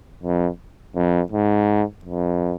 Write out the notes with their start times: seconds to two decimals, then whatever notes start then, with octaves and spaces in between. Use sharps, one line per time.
0.23 F2
0.96 F2
1.32 G#2
2.05 F2